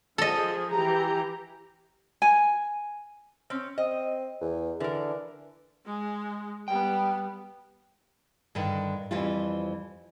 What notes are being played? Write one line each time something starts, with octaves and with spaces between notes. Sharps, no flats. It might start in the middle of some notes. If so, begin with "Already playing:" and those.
F3 G#4 A4 D#5
E3 G4 A#5
G#5
C4 C#4
C4 D#5
E2
D3 E3 A#4
G#3
G3 B3 G5
G2 D3 D#3
F2 E3 F3 G3 F4